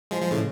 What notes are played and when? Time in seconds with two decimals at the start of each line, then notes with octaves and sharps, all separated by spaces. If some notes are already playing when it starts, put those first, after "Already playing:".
0.11 F3 G#3
0.21 F3 G#3
0.31 A2 C#3